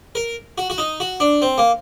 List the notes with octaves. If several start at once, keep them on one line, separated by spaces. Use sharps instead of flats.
A#4
F#4
F#4
D#4
F#4
D4
C4
A#3